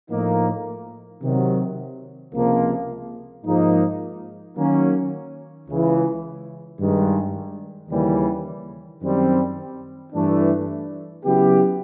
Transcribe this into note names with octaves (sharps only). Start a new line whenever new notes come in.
A2 F3 A#3 D#4
C3 D#3 F#3
C#2 C3 F3 A#3
G#2 F3 A#3 D#4
D#3 F#3 A#3 C#4
C#2 C#3 E3
G2 D#3 G#3
D#2 C#3 E3 G3
F#2 D#3 G3 C4
G2 E3 A3 D4
C#3 F#3 B3 E4 G4